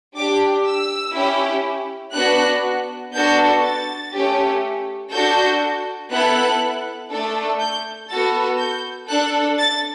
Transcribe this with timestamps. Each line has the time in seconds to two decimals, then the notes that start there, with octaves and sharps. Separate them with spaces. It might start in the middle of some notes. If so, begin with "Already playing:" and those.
0.16 D4 G4 D6
0.66 E6
1.15 C#4 E4 G4
2.15 B3 D4 F#4 F#6
3.13 B3 D4 F#4 A4 G6
3.63 A6
4.13 A3 C#4 G4
5.12 D4 F#4 A4 G6
6.11 B3 E4 A4 F#6
7.10 A3 D4 A4
7.61 G6
8.10 B3 F#4 A4 A6
8.59 G6
9.09 D4 A4 F#6
9.59 A6